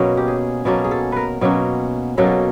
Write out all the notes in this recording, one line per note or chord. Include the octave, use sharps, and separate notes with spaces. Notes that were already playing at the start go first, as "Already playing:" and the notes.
Already playing: B2 F#3 A#3 C#4 A#4
G4
G#4
B2 F#3 A#3 C#4 A4
G#4
A4
A#4 B4
B2 F#3 A#3 C#4
B2 F#3 A#3 C#4 A4